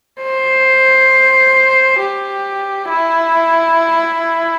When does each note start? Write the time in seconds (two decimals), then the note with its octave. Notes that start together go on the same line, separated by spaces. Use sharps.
0.23 C5
2.00 G4
2.89 E4